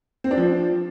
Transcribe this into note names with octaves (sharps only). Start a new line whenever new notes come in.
C4
D4
F3